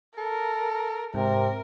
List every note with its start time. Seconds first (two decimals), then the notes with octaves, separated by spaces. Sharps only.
0.18 A4 A#4
1.14 G#2 C3 A#4